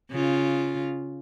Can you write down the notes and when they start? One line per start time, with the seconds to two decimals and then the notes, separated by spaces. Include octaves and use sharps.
0.11 C#3 F4